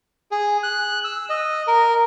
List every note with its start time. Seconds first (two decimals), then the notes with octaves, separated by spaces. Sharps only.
0.31 G#4
0.63 F#6
1.04 E6
1.30 D#5
1.68 A#4